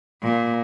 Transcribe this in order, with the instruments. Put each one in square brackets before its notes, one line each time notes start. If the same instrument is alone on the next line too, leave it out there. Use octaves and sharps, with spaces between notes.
[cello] A#2